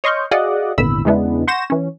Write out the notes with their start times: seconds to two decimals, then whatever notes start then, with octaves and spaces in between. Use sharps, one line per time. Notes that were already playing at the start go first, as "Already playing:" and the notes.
0.04 C#5 D#5 C6 C#6 F6 G6
0.31 F#4 G#4 D5 D#5 F5 F#5
0.78 G#1 E2 A#2 D3 B5 E6
1.05 E2 C#3 G#3 B3 D4 E4
1.47 F#5 C6 C#6 G6 A#6 E7
1.70 E3 C#4